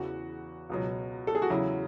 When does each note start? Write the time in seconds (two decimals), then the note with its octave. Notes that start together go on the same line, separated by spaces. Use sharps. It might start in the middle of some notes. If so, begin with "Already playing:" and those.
Already playing: E2 C#3 E3 F#4
0.70 C#2 B2 F#3
1.27 A4
1.35 G#4
1.42 F#4
1.50 E2 C#3 F#3 E4